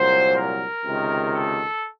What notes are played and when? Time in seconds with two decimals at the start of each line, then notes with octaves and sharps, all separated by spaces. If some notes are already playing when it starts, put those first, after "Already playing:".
Already playing: C2 A#2 F#3 C5
0.35 A#4
0.85 C#2 C3 D#3
1.34 A4